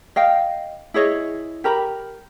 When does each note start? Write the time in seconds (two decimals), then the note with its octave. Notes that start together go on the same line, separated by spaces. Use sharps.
0.16 D#5 F5 G5
0.94 E4 G#4 C#5 D#5
1.64 G4 A#4 A#5 B5